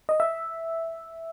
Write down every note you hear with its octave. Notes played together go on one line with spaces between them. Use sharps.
D#5
E5